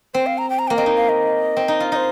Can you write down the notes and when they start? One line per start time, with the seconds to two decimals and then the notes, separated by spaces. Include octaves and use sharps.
0.14 C4 C5
0.26 F5
0.38 A#5
0.50 G5
0.59 A#5
0.68 A#3 G5
0.77 C4 D#5
0.86 D#4
0.97 F5
1.09 D#5
1.57 C4
1.68 D#4
1.80 F4
1.92 D#4 C5 D#5